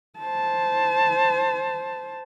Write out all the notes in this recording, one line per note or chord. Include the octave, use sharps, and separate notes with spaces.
C5 A5